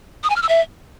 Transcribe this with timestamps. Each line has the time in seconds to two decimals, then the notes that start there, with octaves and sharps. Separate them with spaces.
0.24 D#6
0.30 G#5
0.36 F6
0.43 E6
0.49 E5